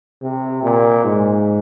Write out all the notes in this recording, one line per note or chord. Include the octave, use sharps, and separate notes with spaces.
C3
A#2
G#2